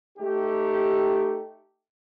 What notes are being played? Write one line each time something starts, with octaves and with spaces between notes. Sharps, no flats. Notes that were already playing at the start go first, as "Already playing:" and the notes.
A3 D#4 G4